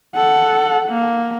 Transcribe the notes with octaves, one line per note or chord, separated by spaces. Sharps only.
A4 F#5
A#3